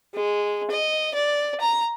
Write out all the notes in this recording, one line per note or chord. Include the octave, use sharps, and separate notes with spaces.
G#3
D#5
D5
A#5